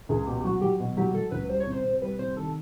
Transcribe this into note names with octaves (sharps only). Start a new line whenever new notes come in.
C#2 G#4
B2 G4
G4
F#3 F#4
F#3 G4
B2
F#3 G4
F#3 A4
C#2 B4
G3 C5
C#5
C3
C5
C3
G3 B4
C3 C5
D#3 A4